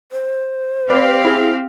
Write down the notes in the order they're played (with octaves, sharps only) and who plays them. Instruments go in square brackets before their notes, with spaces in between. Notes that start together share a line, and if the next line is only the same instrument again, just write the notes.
[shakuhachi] C5
[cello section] C4 G4 F5 [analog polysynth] B4 D5
[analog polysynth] E4 G#4